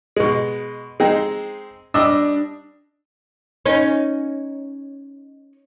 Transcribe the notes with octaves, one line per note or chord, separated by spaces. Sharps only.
B2 G#3
G#3 C4 D#4
G3 D4 D#5 E6
C#4 D#4